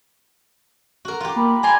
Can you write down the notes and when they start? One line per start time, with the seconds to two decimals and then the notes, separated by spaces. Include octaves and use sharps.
1.05 F#4 A#4
1.20 F4 G4
1.36 A#3 B5
1.63 D5 G#5 A#5 C6